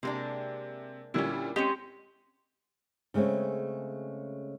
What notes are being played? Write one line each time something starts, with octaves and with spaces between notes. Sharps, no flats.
C3 G#3 A#3 D4
A#2 D3 G3 C#4 E4
G#3 C4 C#4 G4 D#5 C#7
C#3 G#3 A3 C4 C#4